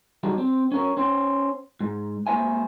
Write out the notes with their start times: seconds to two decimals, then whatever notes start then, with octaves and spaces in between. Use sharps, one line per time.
0.23 F#3 G3 D#4
0.38 C4
0.72 C#4 A#4 C#5
0.97 C#4 C5
1.81 G#2
2.27 G#3 A#3 C#4 C5 E5 G#5